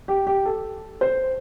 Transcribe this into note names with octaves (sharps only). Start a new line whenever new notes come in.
G4
G4
A4
C5